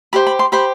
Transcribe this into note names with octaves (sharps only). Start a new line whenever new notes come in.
G4 C5 B5
B5
C6
G4 C5 B5